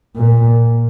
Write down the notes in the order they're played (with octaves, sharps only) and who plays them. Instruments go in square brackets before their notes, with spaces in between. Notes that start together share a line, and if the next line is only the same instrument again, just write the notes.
[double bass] A#2